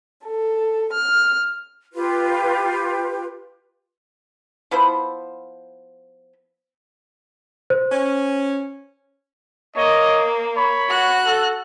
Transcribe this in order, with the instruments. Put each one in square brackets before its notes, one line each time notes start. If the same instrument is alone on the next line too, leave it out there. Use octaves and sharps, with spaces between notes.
[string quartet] A4
F6
[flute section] F4 G4 B4
[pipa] F3 B3 E4 C5
[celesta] C5
[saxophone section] C#4
[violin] A#3 [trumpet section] C#5 D#5
[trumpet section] C#5 B5
[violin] F#4 F#6
[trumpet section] A4